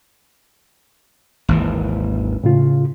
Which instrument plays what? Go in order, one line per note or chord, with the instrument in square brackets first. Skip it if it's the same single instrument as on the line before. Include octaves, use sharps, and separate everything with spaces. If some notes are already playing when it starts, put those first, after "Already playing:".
[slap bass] G#1 D#2 E3
[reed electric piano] A2 C#3 F4